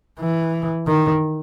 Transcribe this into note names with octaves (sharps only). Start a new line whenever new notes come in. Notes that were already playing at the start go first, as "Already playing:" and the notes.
E3
D#3